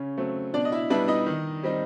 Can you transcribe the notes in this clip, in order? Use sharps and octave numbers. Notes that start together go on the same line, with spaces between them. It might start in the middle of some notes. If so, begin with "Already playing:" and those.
Already playing: C#3 C#4
F#3 A3 C4
B2 D4 D5
D#5
E4 E5
G3 B3 D4 E4 E5
D#4 D#5
D#3
G3 C4 D#4